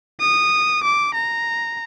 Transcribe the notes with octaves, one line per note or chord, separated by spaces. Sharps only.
D#6
D6
A#5